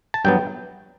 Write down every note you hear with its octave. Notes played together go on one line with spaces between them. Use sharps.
A5
G2 F#3 B3 G5